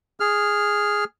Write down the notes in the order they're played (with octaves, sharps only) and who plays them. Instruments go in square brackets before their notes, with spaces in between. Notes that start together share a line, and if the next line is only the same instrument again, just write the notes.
[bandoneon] G#4 F6